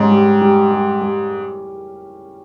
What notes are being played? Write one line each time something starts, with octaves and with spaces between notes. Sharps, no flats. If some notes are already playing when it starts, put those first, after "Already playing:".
Already playing: G#2 G3 C#4
G3
G3
G3
G3